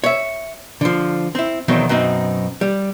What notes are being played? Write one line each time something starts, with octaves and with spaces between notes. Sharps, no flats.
C#5 E5
D3 F3
C4 E4
E2 B2 D#3 F#3 C4
F#2 B2 C4 D#4
G3